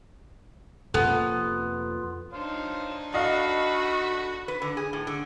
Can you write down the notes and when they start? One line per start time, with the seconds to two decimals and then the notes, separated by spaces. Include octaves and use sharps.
0.94 F2 C3 A#3 B3 F4 A4
2.33 D4 D#4 C5 C#5 F5
3.14 F#4 A4 D5 D#5 F5 B5
4.48 B4
4.62 D3
4.77 G#4
4.93 A2
5.07 D3